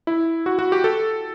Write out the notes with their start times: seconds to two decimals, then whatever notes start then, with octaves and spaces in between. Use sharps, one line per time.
0.07 E4
0.46 F#4
0.59 F#4
0.72 G4
0.84 A4